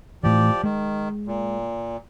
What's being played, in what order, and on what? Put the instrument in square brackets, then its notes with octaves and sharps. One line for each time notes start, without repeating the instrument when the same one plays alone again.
[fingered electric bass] A2 E3 [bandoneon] F3 G4 D5
[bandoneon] D#3 [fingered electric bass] G#3
[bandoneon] A#2